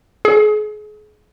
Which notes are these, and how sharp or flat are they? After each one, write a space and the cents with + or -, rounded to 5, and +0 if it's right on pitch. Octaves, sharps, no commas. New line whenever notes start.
G#4 +35